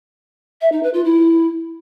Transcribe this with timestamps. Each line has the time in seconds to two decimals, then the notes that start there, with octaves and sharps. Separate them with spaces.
0.61 E5
0.72 D#4
0.83 B4
0.94 F4
1.05 E4